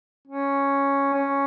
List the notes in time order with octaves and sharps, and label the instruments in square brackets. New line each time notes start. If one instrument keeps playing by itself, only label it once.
[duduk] C#4
C#4